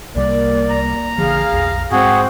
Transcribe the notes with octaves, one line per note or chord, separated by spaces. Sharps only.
C2 C3 G3 A#3 D5
A#5
A#1 D3 F3 G#4 F5
B1 F2
G#2 G#3 C4 F#4 G#4 F#5